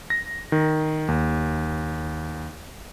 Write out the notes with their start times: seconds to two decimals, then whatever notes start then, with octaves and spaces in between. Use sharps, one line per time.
0.10 A#6
0.52 D#3
1.08 D#2